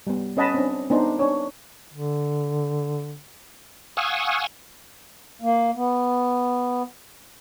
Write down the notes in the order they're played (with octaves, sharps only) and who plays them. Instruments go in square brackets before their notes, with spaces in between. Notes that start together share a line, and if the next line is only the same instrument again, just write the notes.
[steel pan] G3 B3
C#4 B4 D#5 F#5 A5 B5
C4 D4
B3 D4 D#4 C5
D4 C#5
[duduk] D3
[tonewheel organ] F5 F#5 G#5 C#6 D#6 E6
[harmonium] A#3
B3